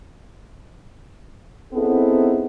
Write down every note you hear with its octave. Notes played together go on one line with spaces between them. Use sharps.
B3 C4 D#4 E4 G#4 A4